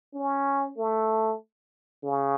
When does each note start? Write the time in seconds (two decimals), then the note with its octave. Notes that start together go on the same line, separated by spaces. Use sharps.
0.14 C#4
0.77 A3
2.04 C#3